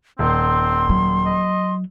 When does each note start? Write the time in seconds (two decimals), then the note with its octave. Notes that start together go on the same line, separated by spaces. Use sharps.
0.19 D#1 C4 C6
0.89 F#3
1.26 D#5